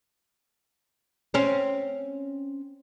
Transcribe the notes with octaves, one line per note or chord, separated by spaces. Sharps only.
C4 C#4